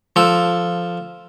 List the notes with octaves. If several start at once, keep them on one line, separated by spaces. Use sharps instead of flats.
F3 A4